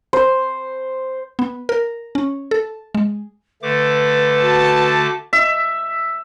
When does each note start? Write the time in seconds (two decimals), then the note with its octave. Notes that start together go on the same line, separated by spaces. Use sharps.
0.13 C5
1.39 B3
1.69 A#4
2.15 C#4
2.51 A4
2.95 G#3
3.63 D3 A3 B4 D6
4.40 F#4 A5
5.33 E5